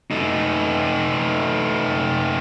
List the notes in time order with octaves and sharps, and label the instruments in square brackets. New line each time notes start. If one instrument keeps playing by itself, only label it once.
[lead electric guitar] A3 D#4